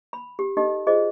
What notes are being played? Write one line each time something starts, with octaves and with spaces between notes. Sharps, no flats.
B5
G4
D#4 G4 A4 D#5
F4 G#4 C5 D#5